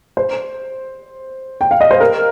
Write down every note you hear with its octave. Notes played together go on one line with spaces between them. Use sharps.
C5
G5
F5
D#5
C5
A#4